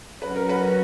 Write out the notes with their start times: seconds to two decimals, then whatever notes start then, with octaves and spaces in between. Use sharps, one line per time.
0.21 F#3 C#4 F#4 B4
0.36 A#4
0.49 B4